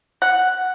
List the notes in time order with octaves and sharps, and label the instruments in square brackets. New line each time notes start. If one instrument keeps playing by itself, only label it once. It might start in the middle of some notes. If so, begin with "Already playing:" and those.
[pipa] F#5